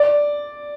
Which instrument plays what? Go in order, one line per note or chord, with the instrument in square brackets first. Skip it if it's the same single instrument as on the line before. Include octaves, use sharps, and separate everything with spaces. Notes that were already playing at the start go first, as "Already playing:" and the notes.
Already playing: [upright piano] D5